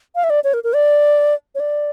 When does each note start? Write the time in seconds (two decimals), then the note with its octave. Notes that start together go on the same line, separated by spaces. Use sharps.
0.15 F5
0.24 E5
0.30 D5
0.44 C#5
0.54 A#4
0.64 A#4
0.73 D5
1.55 C#5
1.60 D5